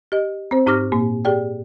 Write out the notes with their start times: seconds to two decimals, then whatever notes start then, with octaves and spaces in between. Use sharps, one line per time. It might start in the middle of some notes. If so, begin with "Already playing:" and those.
0.12 G4 D#5
0.51 C4 C5
0.66 G#2 D#4 G4 D6 F6 A#6
0.92 A#2 A#3
1.25 G4 G#4 D5 G5